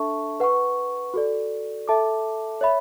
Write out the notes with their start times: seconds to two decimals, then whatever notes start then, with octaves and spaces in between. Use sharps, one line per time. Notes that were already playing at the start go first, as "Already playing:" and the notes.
Already playing: D4 A4 E5 A5 C#6
0.40 B4 F#5 C#6
1.14 F#4 A4 D5
1.88 A4 E5 A5 D6
2.61 C#5 E5 B5